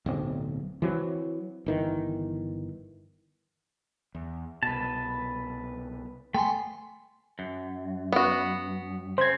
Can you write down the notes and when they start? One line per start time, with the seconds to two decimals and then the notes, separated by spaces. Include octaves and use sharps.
0.06 D1 B1 C4
0.82 E3 F#3 C4
1.66 G1 D#3 E3
4.15 E2
4.63 C2 B2 B4 A5
6.34 A3 B3 G5 G#5 C6
7.39 F#2
8.12 B3 F#4
9.18 C#3 C4 C5 G#6